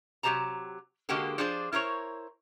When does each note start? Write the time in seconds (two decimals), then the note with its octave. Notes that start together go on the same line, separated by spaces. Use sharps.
0.23 C3 F#3 G4 C5 A5 A#5
1.09 D3 G#3 A#3 F#4 G4 A4
1.38 F3 D4 F4 G#4 C5 D5
1.73 E4 A#4 C5 C#5